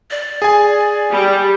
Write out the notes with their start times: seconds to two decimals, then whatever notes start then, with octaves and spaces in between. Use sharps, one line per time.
0.11 D5
0.42 G#4 G#5
1.13 G3